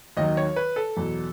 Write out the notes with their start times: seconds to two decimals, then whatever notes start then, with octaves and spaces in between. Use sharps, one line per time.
0.17 D#2 D#3 F#3 D#5
0.37 C#5
0.56 B4
0.76 A4
0.97 E2 B2 F#3